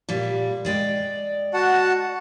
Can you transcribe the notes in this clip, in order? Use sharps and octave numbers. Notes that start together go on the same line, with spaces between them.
A#2 G3
G#3 D5 G5
F#4 F#5 A5